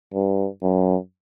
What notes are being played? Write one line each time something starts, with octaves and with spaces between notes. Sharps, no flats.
G2
F#2